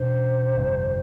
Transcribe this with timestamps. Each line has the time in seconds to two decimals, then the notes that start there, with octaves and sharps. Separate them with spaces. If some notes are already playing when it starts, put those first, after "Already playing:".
Already playing: E2 B2 D4 C5
0.56 G1 F2 C3 G3